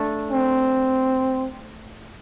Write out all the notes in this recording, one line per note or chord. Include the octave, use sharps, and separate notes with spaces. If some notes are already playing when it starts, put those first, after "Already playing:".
Already playing: A3 D4
C4